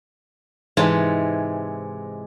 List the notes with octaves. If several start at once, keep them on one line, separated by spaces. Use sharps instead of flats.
G#2 C3 E3 G#3 D#4 A5